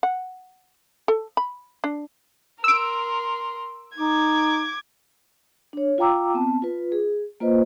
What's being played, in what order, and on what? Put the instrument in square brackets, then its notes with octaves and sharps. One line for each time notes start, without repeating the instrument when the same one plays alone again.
[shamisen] F#5
A4
B5
D4
[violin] A#4 C6 [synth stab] E6 D7
[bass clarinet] D#4 [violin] D6 G#6
[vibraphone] D4 C#5
F4 F5 G5 A#5 D6 E6
B3 C4 A5
F4 B4
G#4
A#3 F4 B4 C5 D#5